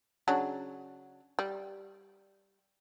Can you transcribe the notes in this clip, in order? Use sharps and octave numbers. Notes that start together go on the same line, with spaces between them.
C#3 F#3 D4
G3